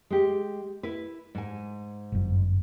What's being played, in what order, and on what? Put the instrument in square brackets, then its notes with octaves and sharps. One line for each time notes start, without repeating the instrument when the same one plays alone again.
[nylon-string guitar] G#3 G4
E4 B4
G#2 G#5
[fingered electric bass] G1 F#2